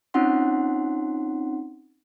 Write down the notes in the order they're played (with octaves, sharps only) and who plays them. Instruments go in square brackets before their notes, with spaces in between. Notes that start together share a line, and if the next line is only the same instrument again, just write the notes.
[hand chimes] C4 C#4 D#4 F4 F#5 C6